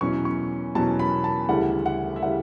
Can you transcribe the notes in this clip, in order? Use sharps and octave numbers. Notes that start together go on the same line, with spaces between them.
E2 B2 F#3 C#4 C#6
C#6
E2 B2 F#3 C#4 A5
B5
A5
D2 C#3 E3 G3 F#5
F#5
E5
C#3 E3 G3 F#5